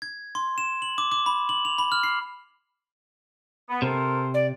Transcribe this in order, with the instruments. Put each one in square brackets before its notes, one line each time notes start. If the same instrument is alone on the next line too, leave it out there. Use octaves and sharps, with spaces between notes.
[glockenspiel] G#6
C6
E7
F#7
D6
D6
B5
F#7
F7
B5
F6
C7
[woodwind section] B3
[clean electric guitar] C3 [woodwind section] A4 A#4 C5
[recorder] D5